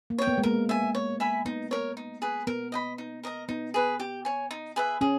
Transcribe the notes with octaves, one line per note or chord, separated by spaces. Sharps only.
A#3
C#5 G5
B3
G#3
A#3 A#4
E5 G#5
C#5
E5 G#5 B5
B3 D#4
A#4 C#5
D#4
G#4 B4
B3 A#4
D#5 G5 B5
D#4
A#4 D#5 A#5
B3 D#4
G#4 B4
G4
C#5 G#5
D#4
G#4 B4 E5
C#4 G#4